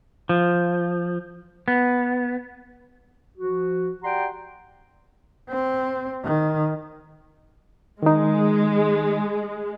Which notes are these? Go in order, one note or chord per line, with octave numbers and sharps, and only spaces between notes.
F3
B3
F3 F#4
G4 D5 F#5 G5 A#5 C6
C4
D#3
D#3 G#3 D#4